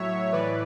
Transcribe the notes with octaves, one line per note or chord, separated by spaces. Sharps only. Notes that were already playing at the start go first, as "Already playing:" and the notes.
Already playing: A2 F#3 C#5 E5
A2 E3 B4 D5